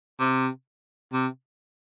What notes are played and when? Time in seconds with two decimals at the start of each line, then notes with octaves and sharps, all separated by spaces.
0.20 C3
1.13 C3